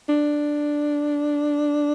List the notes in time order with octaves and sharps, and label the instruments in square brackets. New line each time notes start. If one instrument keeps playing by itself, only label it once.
[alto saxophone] D4